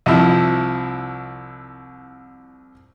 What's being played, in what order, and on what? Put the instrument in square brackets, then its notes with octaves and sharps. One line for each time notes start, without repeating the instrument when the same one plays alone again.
[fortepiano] C2 F3 E4